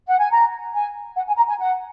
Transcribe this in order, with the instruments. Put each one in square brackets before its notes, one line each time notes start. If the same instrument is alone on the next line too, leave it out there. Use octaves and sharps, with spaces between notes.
[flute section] F#5
G#5
A#5
G#5
F#5
G#5
A#5
G#5
F#5